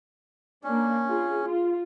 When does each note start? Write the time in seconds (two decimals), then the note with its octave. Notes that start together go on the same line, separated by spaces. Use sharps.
0.64 A#3 C#4 D4
1.07 F4 G#4
1.42 F4